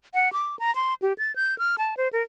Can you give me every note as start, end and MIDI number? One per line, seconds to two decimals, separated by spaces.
0.14 0.32 78
0.33 0.56 86
0.59 0.74 82
0.76 0.94 84
1.02 1.13 67
1.18 1.35 93
1.36 1.58 91
1.58 1.76 89
1.78 1.95 81
1.97 2.09 72
2.13 2.23 70